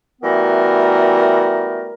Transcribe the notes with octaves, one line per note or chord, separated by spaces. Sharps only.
E3 G3 A3 B3 F#4 A#4